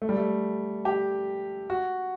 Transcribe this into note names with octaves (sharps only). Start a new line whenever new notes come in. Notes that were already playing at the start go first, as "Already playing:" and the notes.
A3
G3
A3
G4
F#4